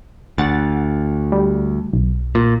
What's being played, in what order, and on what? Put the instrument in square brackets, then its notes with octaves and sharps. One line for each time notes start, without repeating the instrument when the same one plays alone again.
[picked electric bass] D2 [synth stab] F#5 A6
[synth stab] G3
B1
[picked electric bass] A#2